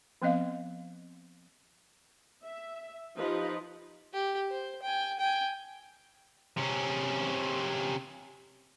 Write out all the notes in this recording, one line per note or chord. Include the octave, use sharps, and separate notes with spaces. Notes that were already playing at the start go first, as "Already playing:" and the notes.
F3 B3 C4 D#5 F5
E5
F3 D#4 G4 B4 D#5
G4
C5
G5 G#5
G5 G#5
C3 C#4